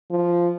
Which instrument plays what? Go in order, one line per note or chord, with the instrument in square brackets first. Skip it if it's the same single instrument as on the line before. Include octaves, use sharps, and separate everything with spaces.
[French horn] F3